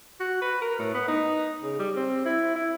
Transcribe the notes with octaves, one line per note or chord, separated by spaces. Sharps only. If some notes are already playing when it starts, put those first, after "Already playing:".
F#4
B4
A#4
A2
B3
D#4
C#3
G3
C4
E4
E4